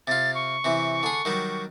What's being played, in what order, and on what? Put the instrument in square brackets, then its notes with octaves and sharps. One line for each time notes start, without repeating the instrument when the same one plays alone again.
[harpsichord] C3 F4 [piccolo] A6
[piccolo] C#6
[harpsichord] C3 E3
D3 G#4
D#3 F#3 G3